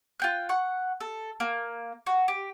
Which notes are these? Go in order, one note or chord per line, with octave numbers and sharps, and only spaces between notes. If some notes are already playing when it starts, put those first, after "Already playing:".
F4 G5 F#6
F#5 C#6
A4
A#3
F#4
G4